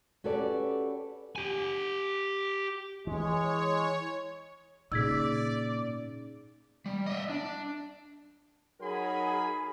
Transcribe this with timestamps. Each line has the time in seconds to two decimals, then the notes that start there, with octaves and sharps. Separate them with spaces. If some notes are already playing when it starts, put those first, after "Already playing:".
0.24 C#4 F#4 G4 A4 B4 D5
1.36 G4 G#5
3.07 E3 G#3 C#5
4.92 A#2 C#3 D#4 D5 E6 G#6 B6
6.86 G3
7.06 D#5 E5
7.30 D4
8.81 F#3 D#4 G#4 A#4 G#5 B5